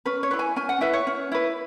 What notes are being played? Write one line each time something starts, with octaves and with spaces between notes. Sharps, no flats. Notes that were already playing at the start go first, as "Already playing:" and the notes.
C#4 B4
C#5
E4 B4
G#5
C#4 G#5
F#5
E4 B4 E5
C#5
C#4
E4 B4